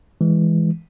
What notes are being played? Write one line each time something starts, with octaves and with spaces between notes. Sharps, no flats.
E3 G#3